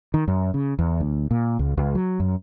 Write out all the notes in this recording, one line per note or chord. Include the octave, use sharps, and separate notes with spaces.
D#3
F#2
C#3
E2
D2
A#2
C#2
C#2
F#3
F#2